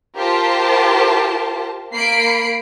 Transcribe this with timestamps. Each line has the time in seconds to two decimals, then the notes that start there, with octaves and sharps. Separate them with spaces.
0.17 F4 G4 A#4 C5 A5
1.94 A#3 B5 C7 D7